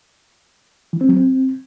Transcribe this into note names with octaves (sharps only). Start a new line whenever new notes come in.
E3
C4
F#3
C4